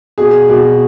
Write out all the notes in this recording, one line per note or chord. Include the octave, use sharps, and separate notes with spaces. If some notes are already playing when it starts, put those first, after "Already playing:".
B2 G#4
B2